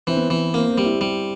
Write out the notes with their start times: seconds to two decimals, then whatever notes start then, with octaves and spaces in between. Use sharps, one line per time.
0.07 E3 C4
0.17 B3
0.28 E3 C4
0.54 A#3 C4
0.70 C4
0.78 G3
0.86 E4
1.01 G3